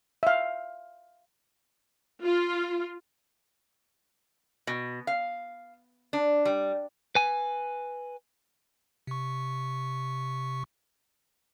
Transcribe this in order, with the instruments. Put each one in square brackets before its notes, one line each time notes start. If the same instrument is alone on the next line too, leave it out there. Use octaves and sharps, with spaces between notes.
[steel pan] E5 F5
[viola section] F4
[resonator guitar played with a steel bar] B2
F5
D4
G3
[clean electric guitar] B4 G#5
[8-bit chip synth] C3 C#6